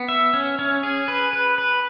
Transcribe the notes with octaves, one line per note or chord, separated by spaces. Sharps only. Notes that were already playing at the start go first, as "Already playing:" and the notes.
Already playing: B3
E5
C#4
C#4
G#4
B4
B4
B4